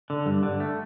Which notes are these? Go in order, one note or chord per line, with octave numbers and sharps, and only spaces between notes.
D3
G2
D3
A3